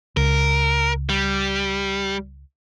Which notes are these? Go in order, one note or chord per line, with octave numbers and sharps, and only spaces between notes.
C#2 A#4
G3